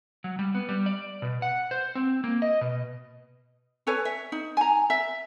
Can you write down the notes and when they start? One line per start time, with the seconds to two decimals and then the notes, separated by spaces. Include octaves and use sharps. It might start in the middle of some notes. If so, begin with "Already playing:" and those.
0.24 F#3
0.39 G3
0.55 B3
0.69 G3
0.86 D5
1.22 B2
1.42 F#5
1.71 C5
1.95 C4
2.24 A#3
2.42 D#5
2.61 B2
3.87 A4 B4 C#5 G#5
4.05 E5
4.32 D#4
4.57 G#5 A#5
4.90 E5